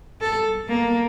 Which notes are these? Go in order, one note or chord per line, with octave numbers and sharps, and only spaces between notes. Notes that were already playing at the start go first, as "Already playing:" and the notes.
A4
A#3